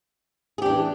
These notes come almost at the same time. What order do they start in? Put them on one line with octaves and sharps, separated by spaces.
G#4 G4 D4 E3